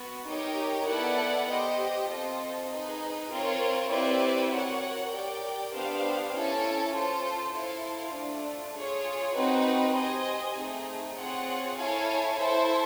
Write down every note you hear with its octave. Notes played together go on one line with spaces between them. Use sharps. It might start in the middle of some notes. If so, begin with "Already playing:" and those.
Already playing: B3 F#4
D#4 G4 A#4 C#5
B3 E4 A4 D5 F#5
G4 C5 D#5
C4 F4 A4 C5 D#5
D#4 G#4 B4
C4 F4 A#4 C#5
C4 E4 G4 B4 D5
F#4 A#4 C#5 F#5
G4 A#4 D5 G5
B3 D4 G4 C5 F5
C#4 E4 A4
F4 A4 C5
E4 A4 C5 F5
A3 D4 F4
F4 G#4 C#5
C4 D#4 F#4 B4
G4 C5 D#5 G#5
A3 C4 D#4 G#4
C4 F4 G#4 C#5 F#5
E4 A4 C#5 F5 G#5
E4 A4 C5 E5